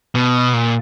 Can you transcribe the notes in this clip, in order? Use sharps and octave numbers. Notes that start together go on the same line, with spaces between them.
B2
A#2